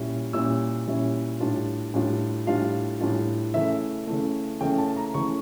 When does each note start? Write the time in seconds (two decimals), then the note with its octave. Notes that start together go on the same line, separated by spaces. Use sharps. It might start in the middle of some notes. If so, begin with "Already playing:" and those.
Already playing: A#2 G3 C#4 E4
0.33 A#2 G3 C#4 E4 E6
0.87 A#2 G3 C#4 E4
1.40 A2 G3 D4 F4
1.94 A2 G3 D4 F4
2.47 A2 G3 D4 F4 F5
3.00 A2 G3 D4 F4
3.54 C#3 E3 A3 E5
4.07 C#3 E3 A3
4.61 C#3 E3 A3 G5
4.78 A5
4.97 A#5
5.14 C#3 E3 A3 C#6